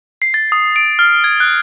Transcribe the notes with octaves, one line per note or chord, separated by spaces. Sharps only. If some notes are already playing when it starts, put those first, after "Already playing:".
C7
A6
D#6
D7
F6
G#6
F#6